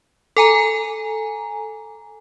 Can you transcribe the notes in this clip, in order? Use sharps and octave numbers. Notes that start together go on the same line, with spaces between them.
A4 G#5 A#5